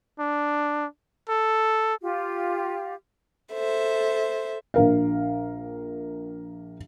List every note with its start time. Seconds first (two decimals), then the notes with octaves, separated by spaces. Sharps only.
0.19 D4
1.29 A4
2.01 F4 G4
3.52 A4 C5 E5
4.74 A#1 A#4 F5